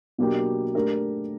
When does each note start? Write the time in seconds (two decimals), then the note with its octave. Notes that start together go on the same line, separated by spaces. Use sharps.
0.18 B2 F#3 A#3 D4 G4
0.75 A3 D4 G4 A#4